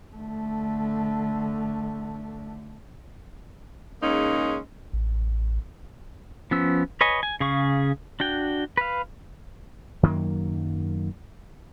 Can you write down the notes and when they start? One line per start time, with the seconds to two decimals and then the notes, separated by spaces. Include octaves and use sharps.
0.16 D3 A3
4.01 C#3 G#3 A#3 C#4 D#4
4.93 A1
6.51 F3 B3 C#4 E6
7.01 B4 C#5 D#5 G#5
7.23 G#5
7.40 C#3 G#4 F5 C#6
8.20 D4 F#4 G5
8.77 B4 F5
10.03 F#2 D#3 F#3 A#3